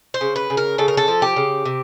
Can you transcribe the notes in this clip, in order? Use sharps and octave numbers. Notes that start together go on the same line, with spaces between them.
C5
C#3
B4
C#3
A#4
C#3 A4
A#4
A4
F3
G4
C#3
C3